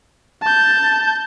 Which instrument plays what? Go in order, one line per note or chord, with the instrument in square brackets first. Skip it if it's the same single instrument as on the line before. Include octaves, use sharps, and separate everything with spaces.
[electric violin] A5 G6